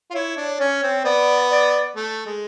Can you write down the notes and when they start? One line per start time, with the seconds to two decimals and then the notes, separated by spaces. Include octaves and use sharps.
0.10 F4
0.14 E4 C#5
0.37 D4
0.59 C#4 C#5
0.83 C4
1.05 B3 D5
1.51 D5
1.96 A3
2.26 G#3